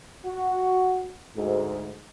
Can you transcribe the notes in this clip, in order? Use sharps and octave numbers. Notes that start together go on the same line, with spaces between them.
F#4
D2 G#2